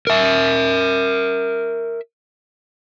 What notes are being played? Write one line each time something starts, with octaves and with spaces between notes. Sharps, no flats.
A#4 E5